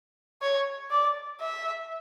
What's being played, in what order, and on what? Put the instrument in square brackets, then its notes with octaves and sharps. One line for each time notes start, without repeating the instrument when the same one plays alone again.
[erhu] C#5
D5
E5